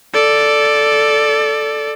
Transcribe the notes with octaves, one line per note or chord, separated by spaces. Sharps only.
A4 D5